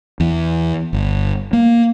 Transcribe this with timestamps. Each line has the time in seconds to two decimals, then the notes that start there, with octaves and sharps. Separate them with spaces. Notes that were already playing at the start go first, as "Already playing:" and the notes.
0.20 E2
0.93 G1
1.53 A#3